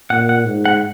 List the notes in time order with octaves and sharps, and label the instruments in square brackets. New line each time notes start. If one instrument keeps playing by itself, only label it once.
[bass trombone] A#2 [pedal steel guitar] F#5
[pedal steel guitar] F#5
[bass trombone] G#2
[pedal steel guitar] F#5